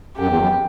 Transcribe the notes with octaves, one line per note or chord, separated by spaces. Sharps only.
F#2 G4
E2
F#2